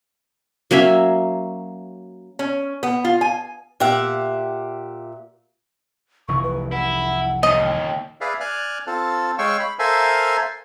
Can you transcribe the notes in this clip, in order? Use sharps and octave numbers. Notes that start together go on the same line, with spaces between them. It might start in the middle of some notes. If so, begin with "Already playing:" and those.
F#3 A#3 C#4 E5
C#4
B3
F4
G#5
A#2 G4 E5 F#5
F1 C2 E3 C#6
B4
E4 F#5
D#2 A#2 D#5
G5
G#4 B4 D5 E5 F5
D5 G#5 F6 F#6
C4 F4 A4 A5
G#3 C#5 F5 G5 C#6 E6
B5
A4 A#4 C5 E5 F5 G#5